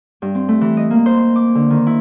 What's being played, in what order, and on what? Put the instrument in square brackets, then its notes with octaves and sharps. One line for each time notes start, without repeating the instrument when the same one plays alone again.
[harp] G2
C4
A3
E3
D#5
A#3
C5
C6
D6
D3
D#3
E4